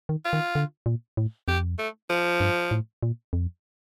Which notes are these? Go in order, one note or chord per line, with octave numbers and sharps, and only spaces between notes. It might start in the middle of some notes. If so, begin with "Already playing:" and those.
D#3
F4
D#3
D3
A#2
A2
F2 G4
A3
F3
G2
A2
A#2
F2